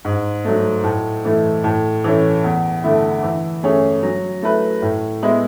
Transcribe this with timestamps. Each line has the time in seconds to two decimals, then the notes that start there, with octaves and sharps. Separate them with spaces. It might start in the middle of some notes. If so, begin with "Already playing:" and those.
0.05 G#2
0.45 F#3 A3
0.83 A2
1.25 E3 A3 E4
1.64 A2
2.04 E3 A3 C#4
2.44 E2
2.84 D3 A3 E4
3.23 E3
3.63 A3 C#4 G#4
4.03 F#3
4.42 A3 E4 B4
4.82 A2
5.23 G#3 B3 E4